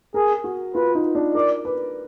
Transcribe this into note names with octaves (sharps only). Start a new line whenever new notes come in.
G#4 A#4
F#4
F4 B4
D#4
D4
A#4 D5
B4